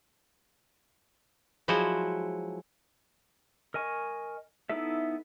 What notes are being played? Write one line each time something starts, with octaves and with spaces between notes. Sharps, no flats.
F3 F#3 G#3 E4 F#4 C5
A#4 D#5 G#5 C#6
B3 D#4 E4 A4 E5